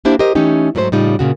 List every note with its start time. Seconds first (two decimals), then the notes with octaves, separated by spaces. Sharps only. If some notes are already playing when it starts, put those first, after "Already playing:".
0.05 A#3 D4 E4 G4 C5
0.19 G4 A#4 C5 D#5
0.35 E3 A3 C#4 D#4 G4
0.75 G#2 F#3 A3 B4 C5
0.92 A2 C#3 G3 D#4 F4
1.19 A#2 C#3 F#4